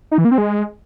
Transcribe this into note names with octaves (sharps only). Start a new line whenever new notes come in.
D#4
E3
A#3
C4
G#3